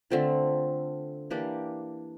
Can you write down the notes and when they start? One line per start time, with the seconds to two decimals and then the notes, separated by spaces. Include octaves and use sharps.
0.10 D3 A3 C4 F4
1.30 E3 A#3 D4 G4